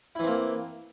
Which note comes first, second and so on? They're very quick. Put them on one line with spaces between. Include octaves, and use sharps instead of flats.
E4 E3 C4 A#3